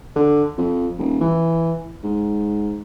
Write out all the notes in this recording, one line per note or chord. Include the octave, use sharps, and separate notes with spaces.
D3
F2
D#1
E3
G#2